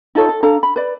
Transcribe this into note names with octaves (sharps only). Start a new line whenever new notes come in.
D#4 F4 A4 C#5
A4
D4 A4 F5 A#5
B5
B4 D5